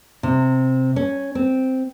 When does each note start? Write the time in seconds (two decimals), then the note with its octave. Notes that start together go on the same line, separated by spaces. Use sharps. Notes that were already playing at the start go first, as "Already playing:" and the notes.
0.23 C3
0.96 C#4
1.35 C4